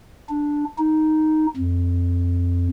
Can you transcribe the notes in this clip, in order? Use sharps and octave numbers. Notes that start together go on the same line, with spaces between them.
D4
D#4
F2